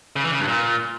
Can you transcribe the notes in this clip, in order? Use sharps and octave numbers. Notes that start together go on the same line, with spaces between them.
C#3
E3
C#3
G2
A#2